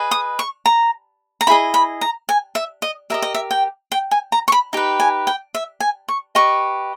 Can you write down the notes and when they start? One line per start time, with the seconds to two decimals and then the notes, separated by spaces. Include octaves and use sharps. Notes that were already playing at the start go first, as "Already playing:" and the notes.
Already playing: G#4 B4 D#5
0.11 D#6
0.39 C#6
0.66 A#5
1.41 A#5
1.47 E4 G#4 D#5 B5
1.74 B5
2.01 A#5
2.29 G#5
2.55 E5
2.82 D#5
3.10 G4 A#4 D#5 E5
3.22 D#5
3.35 E5
3.51 G5
3.92 G5
4.11 G#5
4.32 A#5
4.48 C#6
4.52 B5
4.73 D#4 G4 B4
5.00 G#5
5.27 G5
5.55 E5
5.80 G#5
6.09 C#6
6.35 G4 B4 D#5 C#6